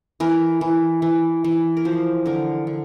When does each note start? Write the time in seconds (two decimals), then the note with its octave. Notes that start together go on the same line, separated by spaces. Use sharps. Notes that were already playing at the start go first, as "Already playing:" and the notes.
0.20 E3 A#4
0.61 E3
1.02 E3
1.44 E3
1.77 A#4
1.85 F3 C5
2.26 D3 A#4
2.67 D3